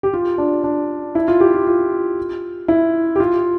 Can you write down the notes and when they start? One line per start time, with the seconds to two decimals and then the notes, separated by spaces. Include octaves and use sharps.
0.03 G4
0.13 F4
0.38 D4
0.64 D4
1.15 E4
1.28 F4
1.40 G4
1.54 F4
1.67 F4
2.68 E4
3.16 G4
3.20 F4